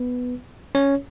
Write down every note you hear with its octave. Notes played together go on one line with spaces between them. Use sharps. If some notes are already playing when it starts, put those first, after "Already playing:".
Already playing: B3 B4
C#4 C#5